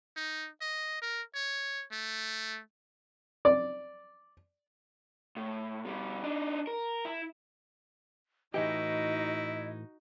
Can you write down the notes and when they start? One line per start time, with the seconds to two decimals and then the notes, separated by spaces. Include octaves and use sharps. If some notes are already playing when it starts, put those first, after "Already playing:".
0.17 D#4
0.61 D#5
1.02 A#4
1.35 C#5
1.92 A3
3.45 D5
5.37 A2
5.85 B2 G3
6.24 D4 D#4
6.67 A#4
7.05 E4
8.54 A2 E3 D#4 E4 F#4 G4 D#5